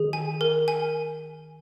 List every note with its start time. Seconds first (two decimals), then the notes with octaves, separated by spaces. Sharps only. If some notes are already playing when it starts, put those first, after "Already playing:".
Already playing: D#3 G#4
0.13 G#5
0.41 A#4
0.68 G#5